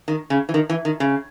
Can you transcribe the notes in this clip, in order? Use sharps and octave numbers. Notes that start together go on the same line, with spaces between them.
D#3
C#3
E3
D#3
E3
D#3
C#3